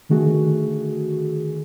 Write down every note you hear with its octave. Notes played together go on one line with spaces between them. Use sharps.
D3 D#3 A3 F#4 G#4